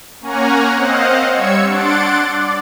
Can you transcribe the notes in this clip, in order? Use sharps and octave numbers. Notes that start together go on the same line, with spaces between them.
A#3 C#4 C#5 F#5 G#5 A#5
C4 C5 D#5 F5 F#5
G3 C#5 E6 G#6 C#7
D4 F#5 C6 A6 D7
D5